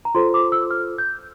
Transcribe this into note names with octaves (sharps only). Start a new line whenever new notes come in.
A#5
F4 A4 C5 C6
D6
E6
F6
G6